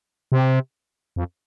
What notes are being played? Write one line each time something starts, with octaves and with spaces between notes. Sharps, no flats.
C3
F2